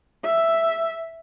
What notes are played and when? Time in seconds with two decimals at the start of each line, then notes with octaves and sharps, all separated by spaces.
0.25 E5